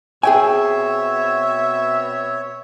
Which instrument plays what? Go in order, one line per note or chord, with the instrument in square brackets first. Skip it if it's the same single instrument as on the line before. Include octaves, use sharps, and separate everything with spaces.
[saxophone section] B2 C4 E5 [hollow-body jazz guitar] G#4 G5 G#5 [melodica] C#5